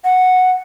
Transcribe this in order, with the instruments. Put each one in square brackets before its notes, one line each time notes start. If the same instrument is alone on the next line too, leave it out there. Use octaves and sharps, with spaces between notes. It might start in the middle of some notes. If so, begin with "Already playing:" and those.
[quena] F#5